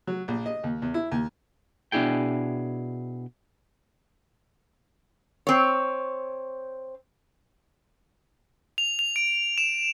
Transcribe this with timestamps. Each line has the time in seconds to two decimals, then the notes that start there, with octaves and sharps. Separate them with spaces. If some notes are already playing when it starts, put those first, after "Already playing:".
0.07 F#3
0.28 A#1
0.46 D#5
0.64 D#2
0.82 E2
0.94 E4
1.12 D#2
1.92 B2 D4 E4 G#4 G5
5.47 C4 C#5
8.78 F7
8.99 F7
9.16 D7
9.58 E7